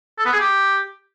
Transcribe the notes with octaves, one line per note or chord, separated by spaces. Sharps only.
A4
B3
G#4
G4